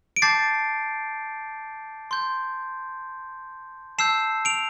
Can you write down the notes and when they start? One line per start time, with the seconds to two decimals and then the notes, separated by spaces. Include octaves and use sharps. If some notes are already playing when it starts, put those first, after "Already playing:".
0.16 D7
0.22 A5 D6 G6 A6 C7
2.11 C6 G6
3.98 A5 E6 G6 C7 E7
4.45 D7 F7